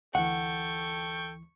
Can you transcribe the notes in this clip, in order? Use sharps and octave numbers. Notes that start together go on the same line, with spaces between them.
D2 E3 A4 F#5 G5 C#6